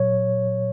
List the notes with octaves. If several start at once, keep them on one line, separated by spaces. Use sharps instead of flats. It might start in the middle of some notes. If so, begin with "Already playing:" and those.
Already playing: A#2 F#3 C#5